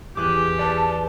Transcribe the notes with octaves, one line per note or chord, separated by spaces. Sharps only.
E2 G4 G#4 D6 F#6
B4 D5 A5